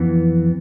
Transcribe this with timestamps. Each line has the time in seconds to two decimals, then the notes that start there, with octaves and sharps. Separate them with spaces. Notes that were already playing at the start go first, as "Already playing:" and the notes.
Already playing: F2 E3 B3